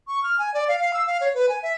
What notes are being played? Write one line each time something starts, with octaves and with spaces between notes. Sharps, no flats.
C#6
F6
G#5
D5
F5
F5
E6
F5
C#5
B4
G#5
E5